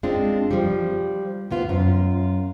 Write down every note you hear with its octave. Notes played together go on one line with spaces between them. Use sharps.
G#3 C4 D4 F4
F3 G3
D2 B3 F4
F#2 F4